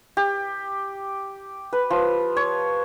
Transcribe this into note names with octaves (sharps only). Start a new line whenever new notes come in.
G4
B4
F3
C#5